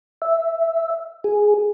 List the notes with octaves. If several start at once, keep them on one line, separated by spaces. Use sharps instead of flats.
E5
G#4